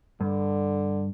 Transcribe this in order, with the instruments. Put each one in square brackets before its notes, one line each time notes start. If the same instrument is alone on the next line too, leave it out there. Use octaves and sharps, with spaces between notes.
[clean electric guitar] G2 [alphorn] D3